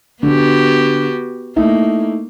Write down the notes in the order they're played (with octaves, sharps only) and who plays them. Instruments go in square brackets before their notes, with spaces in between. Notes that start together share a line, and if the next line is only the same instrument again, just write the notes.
[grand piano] D3 [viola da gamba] B3 F#4 G4
[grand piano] A3 D#4 E4 [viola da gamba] A#3